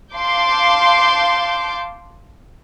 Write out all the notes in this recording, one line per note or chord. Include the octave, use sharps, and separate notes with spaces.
F5 A5 C6 D6 G6